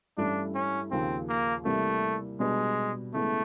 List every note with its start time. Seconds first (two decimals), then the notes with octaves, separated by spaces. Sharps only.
0.17 G2 E3 A3 C#4 D4 E4
0.55 C#4
0.91 D#2 C#3 F3 A#3 C4 C#4
1.29 A#3
1.65 C3 E3 G3 A3 A#3
2.40 B2 G3 G#3 B3 D4
3.13 C#3 E3 G#3 A3 B3